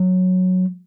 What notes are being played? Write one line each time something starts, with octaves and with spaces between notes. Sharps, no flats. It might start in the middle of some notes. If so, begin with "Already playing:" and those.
Already playing: F#3